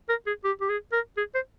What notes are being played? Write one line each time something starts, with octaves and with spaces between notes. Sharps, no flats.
A#4
G#4
G4
G4
G#4
A#4
G#4
C5